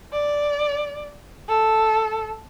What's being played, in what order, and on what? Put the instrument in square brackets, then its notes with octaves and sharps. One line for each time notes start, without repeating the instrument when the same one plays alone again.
[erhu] D5
A4